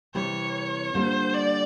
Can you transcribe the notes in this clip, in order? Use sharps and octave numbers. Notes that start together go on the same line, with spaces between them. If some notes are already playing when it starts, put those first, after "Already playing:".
C3 E3 G3 C4 C#5
D3 G3 A#3 D4 F4 C5
D5